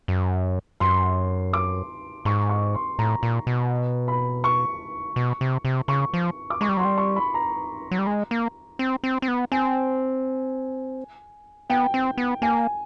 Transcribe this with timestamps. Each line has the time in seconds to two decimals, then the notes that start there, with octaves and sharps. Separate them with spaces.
0.08 F#2
0.80 F#2 C6
1.53 D6
2.25 G#2 C#6
2.49 C#6
2.75 C6
2.99 A2 A#5
3.23 A#2
3.47 B2
4.08 B5
4.44 C#6
5.16 B2
5.41 C3
5.65 C3
5.88 C#3 C#6
6.14 F3
6.50 D6
6.61 G#3 C#6
6.69 G3
6.77 F#3 C6
6.85 G3
6.98 C#6
7.16 B5
7.34 A#5
7.91 F#3
7.99 G3
8.07 G#3
8.31 A#3
8.79 C4
9.03 C4
9.22 C4
9.28 B3
9.52 C4 G#5
11.70 B3 G5
11.94 C4
12.18 B3
12.42 A#3 G#5